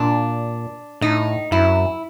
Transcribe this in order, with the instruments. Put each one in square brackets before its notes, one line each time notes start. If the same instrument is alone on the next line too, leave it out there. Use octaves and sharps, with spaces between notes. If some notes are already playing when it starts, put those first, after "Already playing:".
Already playing: [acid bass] A#2 [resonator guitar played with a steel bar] D4
[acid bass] A2 [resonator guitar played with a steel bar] D#4
[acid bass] F#2 [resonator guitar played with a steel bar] E4